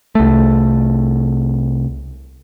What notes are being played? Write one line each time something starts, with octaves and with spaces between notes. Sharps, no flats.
C2 A3